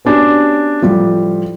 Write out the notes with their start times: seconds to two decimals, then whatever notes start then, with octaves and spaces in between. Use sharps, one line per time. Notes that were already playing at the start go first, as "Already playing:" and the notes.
0.05 B3 C#4 D4 F#4 G4
0.82 A2 F3 G3